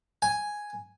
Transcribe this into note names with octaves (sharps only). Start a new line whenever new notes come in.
G#5